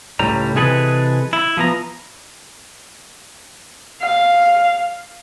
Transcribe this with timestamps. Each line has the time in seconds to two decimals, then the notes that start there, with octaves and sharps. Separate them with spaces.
0.19 C#2 A2 G3 A#5
0.56 C3 E3 G#3 G#4 A4 B4
1.33 E4
1.57 F3 B3 A#5
4.02 F5